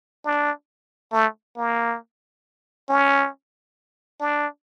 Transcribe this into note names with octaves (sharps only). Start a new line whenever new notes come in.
D4
A3
A#3
C#4
D4